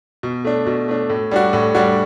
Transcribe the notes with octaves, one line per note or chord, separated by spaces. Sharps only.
B2
A3 D4
B2
A3 D4
A2
G3 D4 F#4
A2
G3 D4 F#4